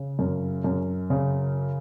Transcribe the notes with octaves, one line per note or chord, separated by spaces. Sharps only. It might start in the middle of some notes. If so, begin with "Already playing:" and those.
Already playing: C#3
F#2
F#2
C#3